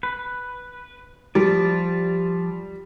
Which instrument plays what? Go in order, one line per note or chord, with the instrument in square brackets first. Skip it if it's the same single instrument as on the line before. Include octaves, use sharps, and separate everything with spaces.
[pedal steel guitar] B4
[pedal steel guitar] F3 D5 [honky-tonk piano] G3